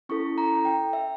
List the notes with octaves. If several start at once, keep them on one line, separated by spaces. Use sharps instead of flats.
C#4 E4 A4 C#6
A#5
G5
E5